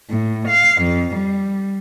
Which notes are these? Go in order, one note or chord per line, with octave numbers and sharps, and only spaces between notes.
A2
F5
F2
G3